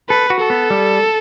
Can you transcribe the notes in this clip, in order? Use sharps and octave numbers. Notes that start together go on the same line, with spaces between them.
A4 B4
F#4
A4
B3
G3